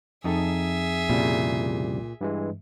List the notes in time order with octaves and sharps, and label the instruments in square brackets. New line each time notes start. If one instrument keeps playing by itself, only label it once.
[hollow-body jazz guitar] F2 D#4 A4 [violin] G#4 E5
[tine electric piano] C2 C#3 G3 [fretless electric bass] A#2
[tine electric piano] G2 E3 G#3